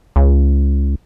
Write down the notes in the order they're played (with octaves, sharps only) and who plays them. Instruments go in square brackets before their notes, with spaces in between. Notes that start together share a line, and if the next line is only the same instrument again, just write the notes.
[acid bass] C#2